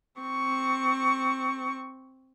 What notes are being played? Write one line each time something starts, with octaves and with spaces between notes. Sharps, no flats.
C4 C#6